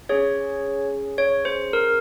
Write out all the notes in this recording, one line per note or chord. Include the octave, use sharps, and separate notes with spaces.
C#4 G#4 C#5
C#5
C5
A#4